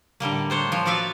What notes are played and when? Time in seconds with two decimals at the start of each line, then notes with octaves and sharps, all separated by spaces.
0.20 A2 D3 G3 A#3
0.50 D4 C5 C#5
0.72 F3
0.86 F4 F#4 D5 E5 F5